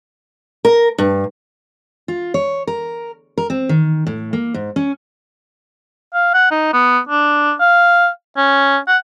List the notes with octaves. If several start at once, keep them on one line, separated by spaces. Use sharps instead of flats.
A#4
G2
F4
C#5
A#4
A#4
C4
D#3
A2
A#3
G#2
C#4
F5
F#5
D#4
B3
D4
F5
C#4
F#5